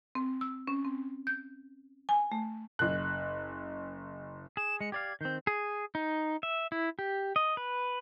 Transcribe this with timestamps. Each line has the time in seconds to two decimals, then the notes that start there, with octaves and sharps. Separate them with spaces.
0.15 C4
0.41 E6
0.67 C#4
0.85 C4
1.27 G6
2.09 G#5
2.32 A3
2.79 F#1 F#6
4.57 G#4 E7
4.81 G#3 C#7
4.92 G4 D5 F5 G#6
5.21 D#3 C4 G6
5.47 G#4
5.95 D#4
6.43 E5
6.72 E4
6.99 G4
7.36 D#5
7.57 B4